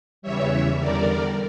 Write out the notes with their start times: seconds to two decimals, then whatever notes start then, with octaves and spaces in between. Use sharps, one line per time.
0.22 E2 C#3 E3 G3 C#5 E5
0.79 E2 D3 G3 A#4 D5